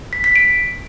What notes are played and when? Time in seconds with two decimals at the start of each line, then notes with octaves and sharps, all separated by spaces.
0.13 B6
0.24 B6
0.36 D7